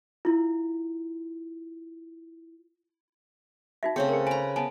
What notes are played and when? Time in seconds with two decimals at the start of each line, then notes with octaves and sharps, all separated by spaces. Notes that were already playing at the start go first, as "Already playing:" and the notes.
0.25 E4 F4
3.83 D#4 F#4 E5
3.96 C#3 A3 C4 G#4 C#5
4.09 G#4 A#4
4.27 B4 G#5 A#5
4.56 B3 G#5 A5